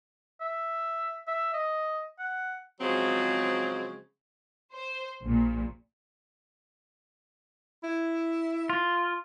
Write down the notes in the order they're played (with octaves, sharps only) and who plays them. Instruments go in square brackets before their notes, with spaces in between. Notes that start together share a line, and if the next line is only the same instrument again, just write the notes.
[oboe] E5
E5
D#5
F#5
[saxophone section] C#3 F3 F#3 G#3 C4
[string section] C5
A#1 A#2
[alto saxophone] E4
[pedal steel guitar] F4